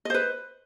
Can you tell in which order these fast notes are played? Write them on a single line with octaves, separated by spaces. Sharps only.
D#5 C5 B4